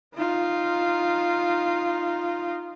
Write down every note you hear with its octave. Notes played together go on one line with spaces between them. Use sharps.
D#4 F4